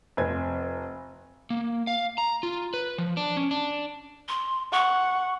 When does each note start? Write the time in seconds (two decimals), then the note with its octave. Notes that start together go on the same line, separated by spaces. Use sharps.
0.17 F1 C4 G#6
1.50 A#3
1.87 F5
2.18 A#5
2.43 F4
2.74 B4
2.98 F3
3.17 D4
3.37 C#4
3.51 D4
4.28 C6
4.72 F#5 C#6